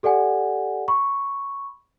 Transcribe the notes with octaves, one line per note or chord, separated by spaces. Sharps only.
G4 A4 D5 F#5 G#5
B5 C#6